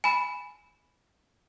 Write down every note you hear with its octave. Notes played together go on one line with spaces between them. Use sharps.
G#5 B5